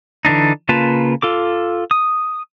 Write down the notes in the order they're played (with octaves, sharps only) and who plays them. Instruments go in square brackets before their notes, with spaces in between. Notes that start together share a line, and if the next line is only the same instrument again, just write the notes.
[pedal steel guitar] D3 E3 D4 D#4
C#3 A#3 F4 B4 A5
F4 A4 D6
D#6